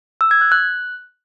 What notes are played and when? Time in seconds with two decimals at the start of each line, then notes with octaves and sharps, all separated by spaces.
0.21 E6
0.31 G#6
0.41 F#6
0.52 F#6